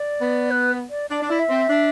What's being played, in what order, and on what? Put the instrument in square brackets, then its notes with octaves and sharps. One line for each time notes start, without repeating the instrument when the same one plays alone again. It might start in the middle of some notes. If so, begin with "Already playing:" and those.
Already playing: [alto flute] D5
[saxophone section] B3
[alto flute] B4
D5
[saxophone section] D4 [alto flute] D5
[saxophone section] D4
E4
[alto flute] E5
[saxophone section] C4
D4